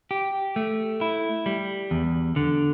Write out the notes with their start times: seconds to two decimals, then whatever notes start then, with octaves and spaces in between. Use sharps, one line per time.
0.11 G4
0.56 A3
1.01 E4
1.46 G3
1.91 E2
2.36 D3